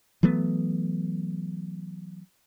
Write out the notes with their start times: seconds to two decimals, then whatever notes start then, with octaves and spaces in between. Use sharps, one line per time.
0.23 E3 F#3 A3 B3